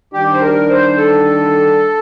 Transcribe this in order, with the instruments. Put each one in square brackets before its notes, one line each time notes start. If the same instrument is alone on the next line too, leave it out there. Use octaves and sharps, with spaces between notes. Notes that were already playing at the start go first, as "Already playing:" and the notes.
[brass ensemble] D#3 G3 D4 [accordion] G4
[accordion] C5
A#4
C5
A4